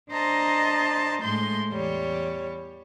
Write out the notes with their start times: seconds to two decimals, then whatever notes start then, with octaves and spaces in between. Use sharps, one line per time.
0.11 D4 C5 D#5 A5 A#5
1.21 A2 G#3 C6 G6
1.71 E2 G3 C#5